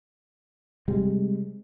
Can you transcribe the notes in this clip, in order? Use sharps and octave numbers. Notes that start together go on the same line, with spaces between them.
C3 G3 G#3